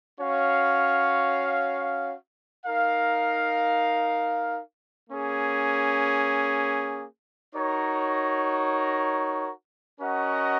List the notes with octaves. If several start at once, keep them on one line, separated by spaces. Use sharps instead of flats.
C#4 F#4 C#5 F5
D#4 A#4 F5
A#3 C#4 G#4
D#4 F#4 A#4 C#5
C#4 F#4 A#4 D#5 F#5